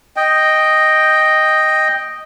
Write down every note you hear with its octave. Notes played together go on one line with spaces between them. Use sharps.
D#5 G5